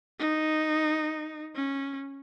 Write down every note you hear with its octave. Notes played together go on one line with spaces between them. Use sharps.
D#4
C#4